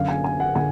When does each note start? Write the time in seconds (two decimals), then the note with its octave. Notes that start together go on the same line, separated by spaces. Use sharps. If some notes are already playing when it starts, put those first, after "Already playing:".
Already playing: F#2 D3 F5
0.08 G#5
0.24 G#5
0.40 F#5
0.55 D3 G#5